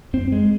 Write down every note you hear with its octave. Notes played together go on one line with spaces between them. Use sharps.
F#2 C4
G#3